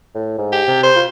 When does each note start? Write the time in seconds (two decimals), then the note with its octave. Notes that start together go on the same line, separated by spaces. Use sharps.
0.15 A2
0.38 G#2
0.53 G4
0.68 C3
0.84 C5
0.96 F4